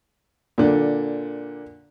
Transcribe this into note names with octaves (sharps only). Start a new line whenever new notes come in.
A#2 D3